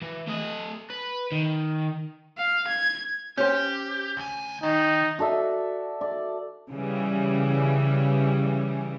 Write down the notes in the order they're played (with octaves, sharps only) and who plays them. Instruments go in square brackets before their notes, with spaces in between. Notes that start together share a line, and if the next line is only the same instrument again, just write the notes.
[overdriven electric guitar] E3
A3 D#5
B4
D#3
[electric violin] F5
G#6
[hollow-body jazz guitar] C#4 C5 [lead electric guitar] G4
[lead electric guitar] D2 G#5
[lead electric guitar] D#3 [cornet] D#4
[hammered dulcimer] F#4 A4 D5 E5
D5
[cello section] C#3 E3 G3